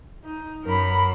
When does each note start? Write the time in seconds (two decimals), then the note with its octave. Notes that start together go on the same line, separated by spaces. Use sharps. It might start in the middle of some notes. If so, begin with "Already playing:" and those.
0.24 D#4
0.65 F#2 A#4 B5